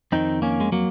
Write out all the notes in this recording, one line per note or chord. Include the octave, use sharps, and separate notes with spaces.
F2 D#3 C4 D#4
A#3 C#4
G#3
F#3 A#3